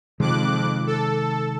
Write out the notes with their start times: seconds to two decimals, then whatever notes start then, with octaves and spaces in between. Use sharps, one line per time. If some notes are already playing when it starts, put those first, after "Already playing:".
0.20 F2 C3 D#3 G#3 D6 F#6
0.87 A4